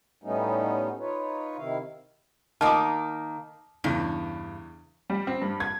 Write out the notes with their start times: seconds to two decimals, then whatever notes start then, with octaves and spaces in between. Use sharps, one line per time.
0.24 A2 G3 A3 B3 C#4 D#4
0.99 D#4 F4 B4 C#5
1.57 C3 D#3 E4 F5
2.61 D#3 A#3 A5 D6 D#6 F6
3.84 E2 G2 C#3
5.10 G3
5.27 C4
5.42 G2
5.60 G#6